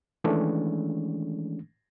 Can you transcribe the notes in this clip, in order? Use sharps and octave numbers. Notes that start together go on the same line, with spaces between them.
D#3 E3 G#3 A3 C#4 D4